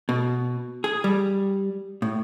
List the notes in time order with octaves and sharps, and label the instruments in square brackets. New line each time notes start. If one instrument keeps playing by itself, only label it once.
[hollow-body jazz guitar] B2
G#4
G3
A2